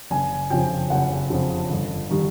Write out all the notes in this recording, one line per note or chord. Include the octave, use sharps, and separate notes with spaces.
F#1 G#5
F2 C#3 F3 G5
F#1 F#5
F2 C#3 F3
G1
D#3 G3